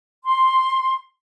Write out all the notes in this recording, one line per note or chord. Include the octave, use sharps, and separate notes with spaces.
C6